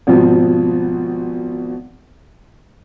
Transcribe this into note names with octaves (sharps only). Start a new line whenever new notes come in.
G#1 B2 F3